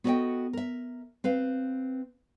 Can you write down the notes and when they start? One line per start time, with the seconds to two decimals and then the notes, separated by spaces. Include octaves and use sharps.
0.04 B3 F#4 A4 C#5 D#5 G5
0.53 A#4 E5
1.24 C4 B4 F5